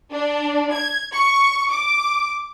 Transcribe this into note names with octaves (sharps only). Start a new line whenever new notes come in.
D4
G#6
C#6
D6